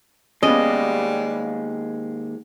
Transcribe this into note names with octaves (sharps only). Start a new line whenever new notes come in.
D#2 G3 G#3 B3 C#4 D#5